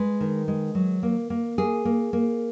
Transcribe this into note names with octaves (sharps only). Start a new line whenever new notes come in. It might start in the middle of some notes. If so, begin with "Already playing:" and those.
Already playing: G#3 B4
D#3
G#3
F#3
A#3
A#3
A#3 G#4
A#3
A#3